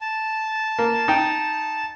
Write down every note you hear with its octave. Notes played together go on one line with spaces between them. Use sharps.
A5
A#3
D#4 G5